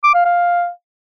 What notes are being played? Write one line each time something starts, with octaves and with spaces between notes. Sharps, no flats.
D6
F5
F5